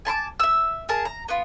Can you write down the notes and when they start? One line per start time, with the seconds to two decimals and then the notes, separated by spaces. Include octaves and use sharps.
0.05 G#5 A5 C6 D6
0.40 E5 E6
0.89 G#4 A#4 A5
1.05 A#5
1.28 B3 F4